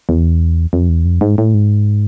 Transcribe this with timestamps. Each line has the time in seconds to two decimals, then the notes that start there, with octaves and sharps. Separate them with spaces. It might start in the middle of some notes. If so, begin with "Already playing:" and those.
0.09 E2
0.73 F2
0.89 E2
1.05 F2
1.21 G#2
1.38 A2
1.54 G#2